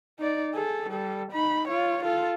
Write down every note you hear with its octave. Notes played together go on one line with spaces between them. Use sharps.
D#4 D5
G#4 A4
G3 A4
D#4 B5
F4 C#5
F4 A4